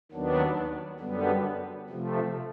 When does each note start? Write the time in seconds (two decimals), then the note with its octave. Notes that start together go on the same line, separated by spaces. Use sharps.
0.12 D#2 D#3 F#3 B3 D4
1.00 F#2 D3 G3 B3
1.89 C3 F3 A3